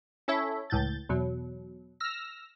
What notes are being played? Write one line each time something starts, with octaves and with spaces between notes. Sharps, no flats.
C#4 E4 A4 C#5 E5
C#2 A2 G6 A6
E2 B2 F#3
E6 F6 A#6